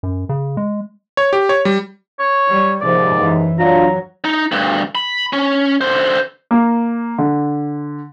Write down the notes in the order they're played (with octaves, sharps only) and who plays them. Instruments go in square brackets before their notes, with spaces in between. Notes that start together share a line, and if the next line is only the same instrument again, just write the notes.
[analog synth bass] F#2
C#3
G#3
[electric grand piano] C#5
G4
C#5
G3
[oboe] C#5
[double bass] G3
[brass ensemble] D#2 G#2 [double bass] C3 F3 [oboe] D5
[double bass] F#2 E3
[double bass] F#3 [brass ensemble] D4 F4 [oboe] A#5
[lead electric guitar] D#4
D2 G2
B5
C#4
D3 C5
[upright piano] A#3
D3